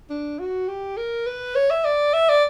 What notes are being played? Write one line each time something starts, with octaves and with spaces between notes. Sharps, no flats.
D4
F#4
G4
A#4
B4
C#5
E5
D5
E5
D5